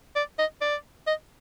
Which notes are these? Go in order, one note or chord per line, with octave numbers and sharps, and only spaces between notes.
D5
D#5
D5
D#5